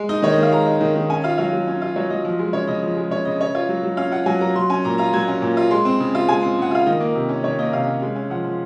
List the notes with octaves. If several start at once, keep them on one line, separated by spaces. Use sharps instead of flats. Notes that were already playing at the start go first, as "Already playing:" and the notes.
Already playing: G#3
D#4 D#5
D#3 C#5
D#5
D#3 F5
G#3 A#5
D#4
D#3
D#3
C#4 G#5
F4 F5
F#3 F5
F#3
C#4
F4
F#3 C#5
F#3 D#5
F3
G#3
C#3 C#5
C#3 D#5
F3
G#3
C#3 C#5
C#3 D#5
C#4 C#5
F4 C#5
F#3
F#3
C#4 F5
F4 F#5
F#3 G#5
F#3 A#5
F#3 C6
C#4 G#5
A#2 A#5
F4 A#5
F#3 G#6
C#4
A#2
F4
G#3 C6
C4
C#3
F4
G#3 G#5
C4
C#3 F#5
F4 F5
D#3 D#5
A#3
C3
C#4
D#3 C#5
A#3 D#5
C3 F5
C#4
G#3
C#4
F3 F#5
F3